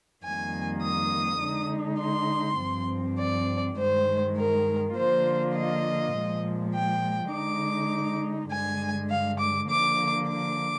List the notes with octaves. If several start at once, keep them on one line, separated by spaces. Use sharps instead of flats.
F2 D#3 G3 A#3 G#5
D#6
D3 G#3 D#4
C6
G2 F3 C4
D5
G2 D#3 G#3 C5
A#4
D3 F3 A#3 F4 C5
D#5
A#2 F3 G#3
G5
D3 G#3 D#4 D6
G2 D3 G#3 G#5
F5
D6
D3 F3 A#3 D6
D6